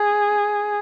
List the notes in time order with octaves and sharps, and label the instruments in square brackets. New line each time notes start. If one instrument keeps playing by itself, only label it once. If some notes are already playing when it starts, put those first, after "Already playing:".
Already playing: [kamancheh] G#4